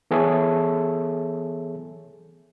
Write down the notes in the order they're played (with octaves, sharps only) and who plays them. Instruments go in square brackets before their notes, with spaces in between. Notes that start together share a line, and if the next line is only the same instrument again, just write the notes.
[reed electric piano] E3 B3 G#4 A4 C#5 E5